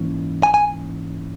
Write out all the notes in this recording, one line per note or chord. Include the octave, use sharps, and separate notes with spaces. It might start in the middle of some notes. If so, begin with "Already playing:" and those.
Already playing: G#2 E3 A#3 C#4
G#5
G#5